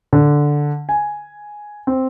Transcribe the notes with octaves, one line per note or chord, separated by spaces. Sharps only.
D3
G#5
C4